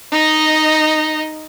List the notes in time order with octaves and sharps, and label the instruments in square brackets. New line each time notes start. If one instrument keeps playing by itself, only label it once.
[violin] D#4 D#5